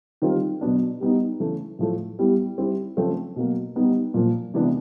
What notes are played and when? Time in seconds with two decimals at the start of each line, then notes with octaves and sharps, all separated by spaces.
0.22 D#3 G3 C4 F4
0.61 B2 F#3 B3 D4
1.01 G3 B3 D#4
1.40 C#3 E3 A3
1.79 A2 F3 A3
2.19 G3 B3 E4 G4
2.58 G3 C4 E4 G4
2.97 C#3 F3 A3 C4
3.36 B2 F#3 A#3
3.76 G3 B3 D#4 G4
4.14 A#2 F3 A#3
4.54 C3 E3 G#3 B3 D4